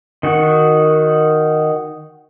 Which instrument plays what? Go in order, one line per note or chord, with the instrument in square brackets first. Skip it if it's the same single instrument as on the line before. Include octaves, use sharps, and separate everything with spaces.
[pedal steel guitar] D#3 F#4